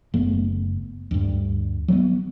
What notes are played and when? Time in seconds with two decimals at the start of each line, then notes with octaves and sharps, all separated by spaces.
0.14 F#1 A3 B3
1.11 D2 G2
1.88 F#3 G3 B3